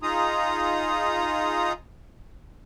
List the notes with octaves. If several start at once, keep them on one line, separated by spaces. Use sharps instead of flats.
D#4 F4 G#4 A#5 D#6